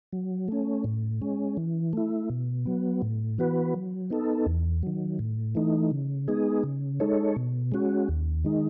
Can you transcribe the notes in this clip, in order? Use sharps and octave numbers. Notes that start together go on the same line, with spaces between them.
F#3
A3 C#4
A2
G#3 C#4
E3
A3 E4
B2
F#3 B3
A2
E3 B3 F#4 B4
F#3
B3 D#4 A4
E2
D#3 F#3
A2
E3 A3 D#4
C#3
G#3 B3 D#4 G#4
C#3
G#3 D#4 A4 C#5
B2
G#3 C#4 F#4
D#2
D#3 G#3 D#4